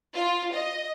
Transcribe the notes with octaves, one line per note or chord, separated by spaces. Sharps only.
F4
D#5